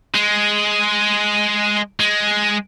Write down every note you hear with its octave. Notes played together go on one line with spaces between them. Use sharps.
G#3
G#3